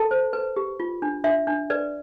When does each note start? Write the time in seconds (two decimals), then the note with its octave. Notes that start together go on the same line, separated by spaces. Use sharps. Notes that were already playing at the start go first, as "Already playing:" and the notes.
Already playing: A4 A5
0.11 C5
0.33 B4
0.56 G4
0.80 F4
1.02 D4
1.24 D4 E5
1.47 D4
1.70 B4 D5